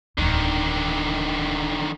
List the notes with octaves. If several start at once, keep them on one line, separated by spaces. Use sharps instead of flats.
D1 E2 D3 D#3